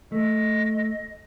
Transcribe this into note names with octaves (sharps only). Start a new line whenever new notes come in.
A3 D#5